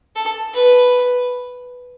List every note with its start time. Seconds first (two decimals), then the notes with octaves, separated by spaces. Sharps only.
0.15 A4
0.54 B4